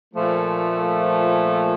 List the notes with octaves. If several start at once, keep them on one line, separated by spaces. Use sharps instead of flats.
A#2 F3 A3